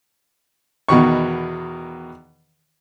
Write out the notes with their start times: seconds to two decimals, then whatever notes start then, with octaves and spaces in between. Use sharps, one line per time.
0.89 E2 B2 D#3 C#6